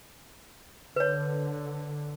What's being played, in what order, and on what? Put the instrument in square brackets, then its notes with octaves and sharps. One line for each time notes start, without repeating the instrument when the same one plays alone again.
[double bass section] D3 [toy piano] B4 C#5